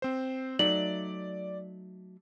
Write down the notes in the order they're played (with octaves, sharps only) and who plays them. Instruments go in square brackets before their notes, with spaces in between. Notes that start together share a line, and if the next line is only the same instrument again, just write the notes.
[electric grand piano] C4 C5
[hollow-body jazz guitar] F#3 A3 D#4 [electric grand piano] D5 [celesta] F#7